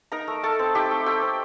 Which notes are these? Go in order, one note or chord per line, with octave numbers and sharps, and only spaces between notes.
D#4 A#4 A#5
A3
A3 A4 A5
C4
D#4 G4 G5
A3
A3 G4 G5
C4